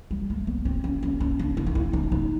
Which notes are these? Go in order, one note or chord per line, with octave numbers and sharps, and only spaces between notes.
G3
A3
B3
C4
C#4
C#4
C#4
D4
E4
D#4
E4
D#4
D#4